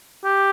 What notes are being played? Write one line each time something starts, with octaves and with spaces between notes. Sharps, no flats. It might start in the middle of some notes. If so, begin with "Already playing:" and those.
G4